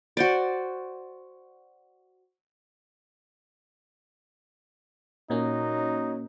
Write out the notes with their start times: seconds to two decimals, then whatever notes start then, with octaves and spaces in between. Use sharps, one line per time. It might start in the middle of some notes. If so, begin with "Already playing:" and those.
0.17 F#4 C5 D5
5.30 A#2 F#3 A#3 C#4 D#4